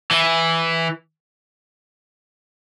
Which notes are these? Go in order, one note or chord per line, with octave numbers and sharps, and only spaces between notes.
E3